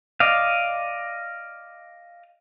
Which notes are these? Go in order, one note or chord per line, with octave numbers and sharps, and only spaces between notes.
D5 D#5 F5